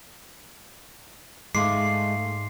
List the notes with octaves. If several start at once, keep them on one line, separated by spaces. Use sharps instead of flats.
G#2 G#3 A3 F5 C6 D6 C7